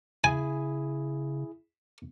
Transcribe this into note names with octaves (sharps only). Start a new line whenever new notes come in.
C#3 E4 G#4 G#5